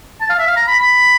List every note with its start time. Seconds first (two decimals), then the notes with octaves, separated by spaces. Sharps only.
0.21 A5
0.30 F5
0.39 E5
0.47 F5
0.56 A#5
0.68 B5
0.80 B5